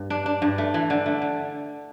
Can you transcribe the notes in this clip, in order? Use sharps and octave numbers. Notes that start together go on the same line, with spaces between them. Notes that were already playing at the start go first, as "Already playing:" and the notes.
Already playing: G2
D4
D4
G2
A3
E3
D3
A3
D3